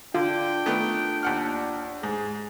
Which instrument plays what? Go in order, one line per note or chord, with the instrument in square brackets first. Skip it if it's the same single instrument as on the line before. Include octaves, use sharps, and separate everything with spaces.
[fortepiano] D3 [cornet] D4 [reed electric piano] F4 [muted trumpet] G5
[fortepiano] D#3 A3 B3
D#2 F#5 F6
[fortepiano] G#2 [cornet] G#4